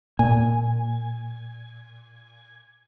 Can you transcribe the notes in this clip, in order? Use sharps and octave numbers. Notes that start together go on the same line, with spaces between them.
A#2 G#5